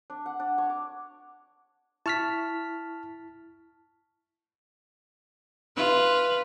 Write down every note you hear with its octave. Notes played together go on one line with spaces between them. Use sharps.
D4
F#5
D4
C#5
D6
E4 A5 C#6 F6 B6
F4 B4